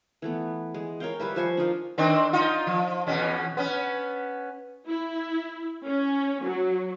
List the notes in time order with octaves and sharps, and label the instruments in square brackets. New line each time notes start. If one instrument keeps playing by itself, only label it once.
[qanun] E3 A3 B3
G#3
A#4 C#5 F5 G5
G3 G4 B4 E5
F3 C5 G#5 C#6
D4 D#4 F4 A#4
[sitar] D#3 C4 D4
D#4 F4
F3
E2 B2 C#4
B3 C#4
[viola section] E4
C#4
F#3